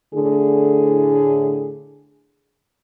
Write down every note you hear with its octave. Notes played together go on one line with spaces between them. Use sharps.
A2 D3 G#4